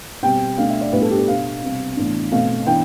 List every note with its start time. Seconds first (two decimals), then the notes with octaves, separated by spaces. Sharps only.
0.23 B2 G3 C4 G5
0.58 B2 A3 D4 F5
0.70 E5
0.81 D5
0.92 A2 G3 B3 D4 B4
1.01 A4
1.11 G4
1.19 A4
1.27 B2 B3 D4 F5
1.62 C3 G3 C4
1.97 A2 E3 B3 D4
2.32 B2 A3 C4 F5
2.66 E3 B3 D4 G5